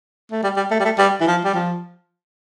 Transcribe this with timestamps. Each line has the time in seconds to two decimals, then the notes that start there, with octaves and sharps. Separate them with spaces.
0.32 A3
0.43 G3
0.57 G3
0.71 A3
0.80 G3
0.85 A3
0.98 G3
1.21 E3
1.27 F3
1.44 G3
1.55 F3